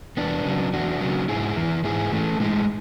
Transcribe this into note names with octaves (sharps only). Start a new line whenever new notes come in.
E2 B3 D4
C#3 F#3
E2 D4 F#4
C#3 F#3
G#2 E4 G#4
E3
G#2 E4 G#4
E3 A3
A2 G#3